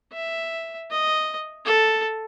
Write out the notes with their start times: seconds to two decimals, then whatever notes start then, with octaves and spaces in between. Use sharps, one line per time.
0.12 E5
0.91 D#5
1.65 A4